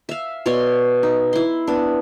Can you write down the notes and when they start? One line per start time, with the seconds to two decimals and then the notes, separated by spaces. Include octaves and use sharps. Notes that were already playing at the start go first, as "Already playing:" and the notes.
0.09 E5 F5
0.46 B2 C#5 D5 C6
1.03 D#4
1.33 E4 C6
1.67 B3 D4